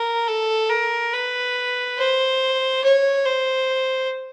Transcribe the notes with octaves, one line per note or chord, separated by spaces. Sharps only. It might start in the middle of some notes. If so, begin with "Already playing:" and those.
Already playing: A#4
A4
A#4
B4
C5
C#5
C5